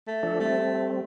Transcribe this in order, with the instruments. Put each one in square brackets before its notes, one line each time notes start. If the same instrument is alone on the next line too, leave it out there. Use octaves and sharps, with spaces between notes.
[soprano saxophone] A3
[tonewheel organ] F3 D4 A4
[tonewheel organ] G3 C4 [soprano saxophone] A3